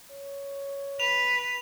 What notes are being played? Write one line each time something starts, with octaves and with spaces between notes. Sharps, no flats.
C#5
B4 F7